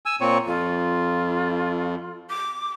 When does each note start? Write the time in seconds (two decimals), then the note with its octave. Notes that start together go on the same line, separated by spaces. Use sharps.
0.06 G#5 E6
0.21 A#2 C4 C#5
0.46 F2 F4
2.29 D6